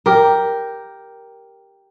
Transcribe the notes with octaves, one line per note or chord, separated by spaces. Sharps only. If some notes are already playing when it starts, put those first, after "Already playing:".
G4 A#4